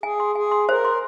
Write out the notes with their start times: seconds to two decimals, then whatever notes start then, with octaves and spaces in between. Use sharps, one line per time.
0.03 G#4 G#5
0.20 C6
0.35 G#4 G#5
0.51 C6
0.69 A#4 C5
0.85 C6